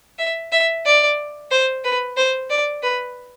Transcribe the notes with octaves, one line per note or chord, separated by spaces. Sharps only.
E5
E5
D5
C5
B4
C5
D5
B4